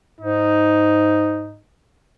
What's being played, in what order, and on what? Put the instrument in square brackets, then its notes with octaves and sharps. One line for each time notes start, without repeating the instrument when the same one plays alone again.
[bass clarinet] G#2 [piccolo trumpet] D#4